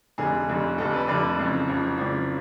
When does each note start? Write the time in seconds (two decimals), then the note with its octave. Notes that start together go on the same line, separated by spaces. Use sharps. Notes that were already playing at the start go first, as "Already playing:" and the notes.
0.18 F1 F2 D3 G#4
0.49 F1 F2 D3
0.78 F1 F2 D3 A4
0.93 B4
1.08 F1 F2 D3 D5
1.39 F#1 F2 C#3 F3
1.68 F#1 F2 C#3 F3
1.98 F#1 F2 C#3 F3 D5